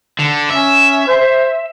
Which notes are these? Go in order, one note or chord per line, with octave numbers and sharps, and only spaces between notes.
D3
C#4 E5
C5